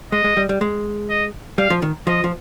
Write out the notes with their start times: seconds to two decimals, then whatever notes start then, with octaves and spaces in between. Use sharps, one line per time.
0.12 G#3 D#5
0.24 G#3
0.37 G3
0.49 G3
0.61 G#3
1.10 D#5
1.58 G3 F5
1.70 F3
1.82 D#3
2.07 F3 D#5
2.24 F3